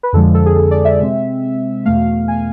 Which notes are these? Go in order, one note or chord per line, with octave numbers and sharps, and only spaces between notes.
B4
F2 D3 F3 G#3 A4
A4
G#4
A4
D5
E5
C3 G#3 C4
E2 B2 A3 F5
G#5